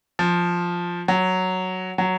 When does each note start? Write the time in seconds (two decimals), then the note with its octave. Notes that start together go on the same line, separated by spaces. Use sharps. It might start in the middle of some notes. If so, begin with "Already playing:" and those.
0.19 F3
1.08 F#3
1.98 F#3